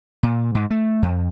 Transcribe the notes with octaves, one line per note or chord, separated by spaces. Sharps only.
A#2
G#2
A3
F2